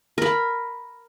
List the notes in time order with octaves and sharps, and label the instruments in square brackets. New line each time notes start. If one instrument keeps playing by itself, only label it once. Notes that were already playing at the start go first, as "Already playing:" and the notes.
[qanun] A#4 B5